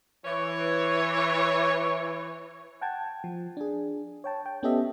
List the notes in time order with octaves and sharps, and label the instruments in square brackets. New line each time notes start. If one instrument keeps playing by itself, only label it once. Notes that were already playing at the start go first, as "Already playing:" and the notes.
[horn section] E3 C#5
[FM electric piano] F#5 G5 A5 G#6
F3
D4 G#4
C#5 G5 A5
G5
B3 C#4 G4 A4 D#5 E5